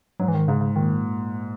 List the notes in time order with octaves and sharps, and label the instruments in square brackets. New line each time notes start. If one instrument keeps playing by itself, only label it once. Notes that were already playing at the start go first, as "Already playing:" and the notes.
[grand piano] G#2 [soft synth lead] F#3
[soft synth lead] E3
D#3
[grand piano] G#2 [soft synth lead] C#3
[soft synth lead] C#3
[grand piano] A#2 [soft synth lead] D#3